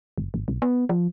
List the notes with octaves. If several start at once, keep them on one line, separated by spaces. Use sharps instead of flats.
F#1
G#1
B1
B3
F3